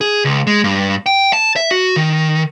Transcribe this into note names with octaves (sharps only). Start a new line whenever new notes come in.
G#4
C#2
G#3
G2
G5
A5
E5
F#4
D#3